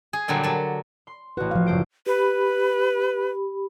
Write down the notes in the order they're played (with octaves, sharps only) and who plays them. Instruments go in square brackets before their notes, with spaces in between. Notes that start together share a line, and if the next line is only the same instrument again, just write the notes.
[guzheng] G#4
A#2 D3 F#3 G3 F#4
F#3 A5
[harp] C6
[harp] A1 F#4 [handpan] B4
[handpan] F3 F5
[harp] F#1 C5 D7
[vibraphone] G4 B5 [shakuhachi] B4